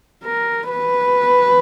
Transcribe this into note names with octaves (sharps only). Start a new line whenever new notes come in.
A#4
B4